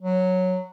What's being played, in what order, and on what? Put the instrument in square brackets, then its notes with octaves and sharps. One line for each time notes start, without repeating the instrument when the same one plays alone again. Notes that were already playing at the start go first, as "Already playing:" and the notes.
[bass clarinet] F#3